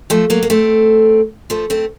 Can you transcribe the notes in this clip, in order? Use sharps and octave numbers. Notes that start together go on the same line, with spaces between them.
F3 A3
F#3 A#3
A#3
A3 C4
F3 A3
A3 C4